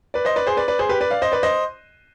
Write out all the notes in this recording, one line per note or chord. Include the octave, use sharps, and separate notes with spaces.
B4 D5
C5 D#5
B4 D5
G#4 C5
B4 D5
B4 D5
G#4 C5
G4 B4
B4 D5
D5 F5
C5 D#5
B4 D5
C5 D#5